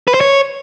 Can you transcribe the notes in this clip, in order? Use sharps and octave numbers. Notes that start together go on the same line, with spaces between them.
B4
C5
C#5